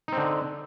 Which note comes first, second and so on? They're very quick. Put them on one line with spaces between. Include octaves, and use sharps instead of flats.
D#4 C4 D3